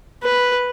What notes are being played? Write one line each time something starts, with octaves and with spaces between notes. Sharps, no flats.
B4